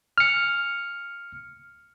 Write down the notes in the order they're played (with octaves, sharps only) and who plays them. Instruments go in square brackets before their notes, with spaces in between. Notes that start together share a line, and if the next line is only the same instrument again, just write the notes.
[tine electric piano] F6 C#7